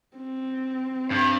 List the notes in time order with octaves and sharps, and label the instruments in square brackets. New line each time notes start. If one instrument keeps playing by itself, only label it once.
[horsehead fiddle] C4
[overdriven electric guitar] G2